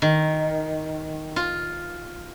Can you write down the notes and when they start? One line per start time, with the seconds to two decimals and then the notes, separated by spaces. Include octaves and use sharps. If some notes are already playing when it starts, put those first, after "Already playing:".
0.02 D#3
1.36 F4